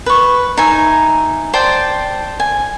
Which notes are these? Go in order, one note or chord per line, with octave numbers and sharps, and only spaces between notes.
B4 C#6
D#4 E5 G#5
C5 D5 G5 A5
G#5